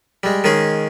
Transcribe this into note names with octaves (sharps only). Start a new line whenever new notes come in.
G3 G#3
D#3 G#3 C#4 G#4